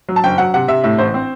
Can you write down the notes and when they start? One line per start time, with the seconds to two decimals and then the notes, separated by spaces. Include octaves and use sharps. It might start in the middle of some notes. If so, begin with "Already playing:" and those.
0.09 F#3
0.16 A5
0.24 F#1 G5
0.38 F#3 F#5
0.54 C3 F#5
0.68 C3 E5
0.84 A2 E5
0.98 A1 C5
1.14 C4